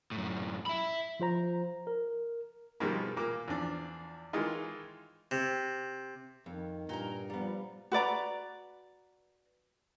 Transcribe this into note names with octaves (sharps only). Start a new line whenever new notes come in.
F#2 A2
E5 B5
F3 F4 C5 A#5
A#4
B2 D#3 F3 G3 G#3 A#3
A#2 A#3 D6
E2 F3 D4
D#3 E3 G#3 D#4 F4
C3
F2 D#3
G2 A#2 D#4 A#4
A#2 F3 G3 B3
F#4 B4 D5 A#5